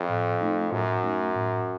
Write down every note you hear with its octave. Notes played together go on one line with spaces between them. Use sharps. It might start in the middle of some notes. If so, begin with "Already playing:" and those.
Already playing: F2
A2
A3 D#4
F#2 A2
A3 D#4
A2